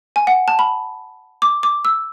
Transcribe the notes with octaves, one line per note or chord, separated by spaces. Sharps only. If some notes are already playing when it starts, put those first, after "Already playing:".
G#5
F#5
A5
B5
D6
D6
E6